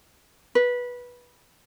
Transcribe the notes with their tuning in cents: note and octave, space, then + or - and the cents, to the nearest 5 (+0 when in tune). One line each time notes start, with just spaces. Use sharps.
B4 -15